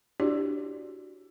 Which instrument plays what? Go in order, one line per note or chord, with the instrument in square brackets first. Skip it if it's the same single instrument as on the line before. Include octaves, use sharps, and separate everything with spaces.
[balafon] D4 E4 F#4 G4 C#5 D5